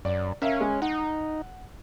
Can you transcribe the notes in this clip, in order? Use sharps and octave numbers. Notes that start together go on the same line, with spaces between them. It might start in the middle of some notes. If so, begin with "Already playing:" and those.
F#2 D5
C#4 A#4 E5 F5
G#3
D#4 F#5